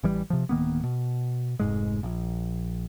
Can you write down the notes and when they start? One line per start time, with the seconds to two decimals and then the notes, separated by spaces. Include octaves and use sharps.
0.03 A1 E3 G3
0.30 C3 F3
0.49 D1 D#3 A#3 B3
0.84 B2
1.60 F1 G#2 G#3
2.03 A#1